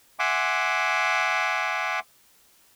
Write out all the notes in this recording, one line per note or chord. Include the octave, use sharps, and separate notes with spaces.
E5 F#5 G#5 C6 D6